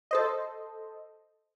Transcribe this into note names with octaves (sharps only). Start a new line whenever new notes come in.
A4 C5 D#5